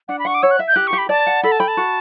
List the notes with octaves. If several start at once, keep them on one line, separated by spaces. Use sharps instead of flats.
D4 F#5
B5
F#5 C#6
D6
C#5 E6
F#6
E5
G6
G4 F#6
C#6
G4
B5
D5 A5
F#5
A4 B5
A5
G5 B5
A5
F#4